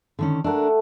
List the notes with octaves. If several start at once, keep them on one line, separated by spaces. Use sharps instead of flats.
D3 D#3 C#4
A3 D4 A4 A#4 F#5